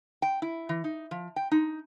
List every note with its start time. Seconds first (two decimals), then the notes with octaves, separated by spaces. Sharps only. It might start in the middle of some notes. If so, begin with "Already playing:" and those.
0.22 G5
0.42 E4
0.69 E3
0.84 D#4
1.11 F3
1.36 G5
1.52 D#4